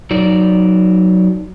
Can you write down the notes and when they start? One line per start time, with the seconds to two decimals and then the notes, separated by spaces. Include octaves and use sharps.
0.11 F#3 D#4 D5